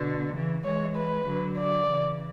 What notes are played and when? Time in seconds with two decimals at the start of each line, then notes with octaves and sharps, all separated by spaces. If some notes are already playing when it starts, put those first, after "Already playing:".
Already playing: B2 D3
0.33 C#3 E3
0.64 E3 G#3 C#5
0.95 B4
1.27 D3 F#3
1.58 D5
1.88 C#3 E3